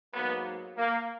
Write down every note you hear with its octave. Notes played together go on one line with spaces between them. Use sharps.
G#2 F#3 A#3 B3
A#3